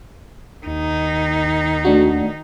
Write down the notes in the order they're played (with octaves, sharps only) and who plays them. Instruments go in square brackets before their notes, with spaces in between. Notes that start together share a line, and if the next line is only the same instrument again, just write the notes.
[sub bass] D#2 [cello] D#3 D#4
[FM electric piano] A3 D4 F#4